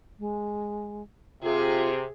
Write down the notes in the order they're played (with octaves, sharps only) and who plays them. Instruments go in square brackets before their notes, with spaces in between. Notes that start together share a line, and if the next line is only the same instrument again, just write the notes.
[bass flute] G#3
[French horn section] C3 [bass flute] F4 [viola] G#4